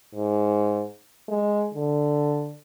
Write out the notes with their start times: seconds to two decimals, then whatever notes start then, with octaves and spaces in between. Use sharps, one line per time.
0.15 G#2
1.28 G#3
1.74 D3